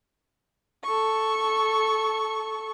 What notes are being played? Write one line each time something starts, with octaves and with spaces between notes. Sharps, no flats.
A4 C#6